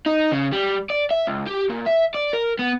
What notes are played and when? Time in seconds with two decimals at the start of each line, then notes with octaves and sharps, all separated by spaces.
0.06 D#4
0.32 C#3
0.53 G3
0.90 D5
1.11 E5
1.27 C#2
1.47 G4
1.70 A#2
1.86 E5
2.15 D5
2.33 A#4
2.59 B3